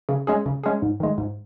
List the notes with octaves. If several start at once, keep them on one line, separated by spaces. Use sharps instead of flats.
C#3
G#3 C#4 G#4
C#3
G#3 C#4 G#4
G#2
D#3 G#3
G#2